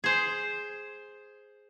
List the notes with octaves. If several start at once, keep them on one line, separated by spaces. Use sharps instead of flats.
G#4 C5